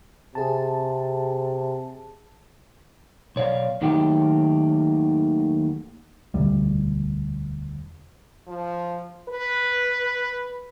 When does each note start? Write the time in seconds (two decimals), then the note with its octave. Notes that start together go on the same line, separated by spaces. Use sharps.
0.35 C3 G#4 A5
3.36 B1 C#5 D5 F5
3.81 D#2 D#3 F#3 A3 F#4 G4
6.34 E1 D2 G3
8.47 F3
9.29 B4